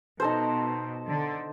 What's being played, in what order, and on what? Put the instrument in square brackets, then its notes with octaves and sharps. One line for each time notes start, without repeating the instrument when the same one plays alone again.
[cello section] B2 [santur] D#4 A4 C5
[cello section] D3